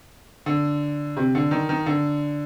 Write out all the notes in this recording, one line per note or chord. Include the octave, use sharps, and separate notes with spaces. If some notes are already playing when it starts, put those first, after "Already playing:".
D3
C3
D3
D#3
D#3
D3